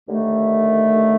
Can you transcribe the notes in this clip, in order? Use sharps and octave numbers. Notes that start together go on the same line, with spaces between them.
D#2 D3 A3